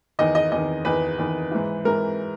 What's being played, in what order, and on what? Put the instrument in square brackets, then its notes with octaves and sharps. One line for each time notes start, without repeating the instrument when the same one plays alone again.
[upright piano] E2 D#3 D#5
D#5
E2 D#3 D#5
E2 D#3 B4
E2 D#3
G#2 E3
G#2 E3 A#4